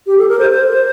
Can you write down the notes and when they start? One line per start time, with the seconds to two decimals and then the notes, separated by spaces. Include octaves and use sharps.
0.07 G4
0.18 A4
0.28 A#4
0.39 C5
0.50 C5